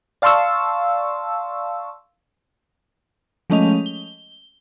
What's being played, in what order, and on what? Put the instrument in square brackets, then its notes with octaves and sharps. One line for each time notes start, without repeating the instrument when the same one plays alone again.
[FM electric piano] D5 F5 A5 C6 C#6 E6
[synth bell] F3 G#3 A3 C#4 D#5 F7
G7